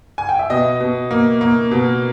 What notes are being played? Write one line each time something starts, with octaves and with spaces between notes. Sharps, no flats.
G#5
G5
E5
B2 D#5
B2
A#3
A#3
B2